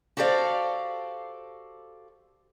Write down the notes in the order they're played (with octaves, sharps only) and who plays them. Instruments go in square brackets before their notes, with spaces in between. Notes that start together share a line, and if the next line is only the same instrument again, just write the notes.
[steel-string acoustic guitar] F#4 G4 A4 C5 D5 F5